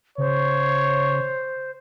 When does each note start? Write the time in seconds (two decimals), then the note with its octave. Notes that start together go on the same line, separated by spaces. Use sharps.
0.18 C#3 C5 C#5